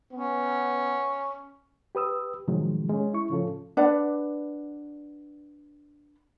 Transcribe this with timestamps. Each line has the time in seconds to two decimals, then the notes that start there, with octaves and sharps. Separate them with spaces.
0.13 B3 C#4
1.95 G4 B4 D#6 E6
2.48 A2 C3 D#3 F3 F#3 G#3
2.90 G#3 C#4
3.14 E4 C#6
3.30 A2 C#3 F3 C#4 F4 A4
3.77 D4 B4 D5 F#5